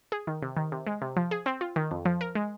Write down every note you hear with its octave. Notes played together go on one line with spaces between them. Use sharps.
G#4
D#3
C3
D#3
C3
G#3
C3
F3
G#4
C4
F4
D#3
F2
F3
A#4
G#3